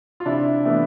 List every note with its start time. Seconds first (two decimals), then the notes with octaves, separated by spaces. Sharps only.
0.20 F4
0.25 C3 D4 E4
0.65 E3 A3 B3